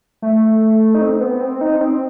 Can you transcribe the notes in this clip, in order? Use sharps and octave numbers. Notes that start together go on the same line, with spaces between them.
A3
D#4
C4
B3
C4
D#4
C4